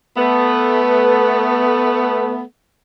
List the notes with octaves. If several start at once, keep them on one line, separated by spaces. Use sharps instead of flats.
A3 B3